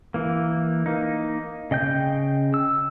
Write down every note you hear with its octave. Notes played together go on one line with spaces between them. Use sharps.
E3 A#3
A#3 D#4
C#3 D#5 G5 G6
E6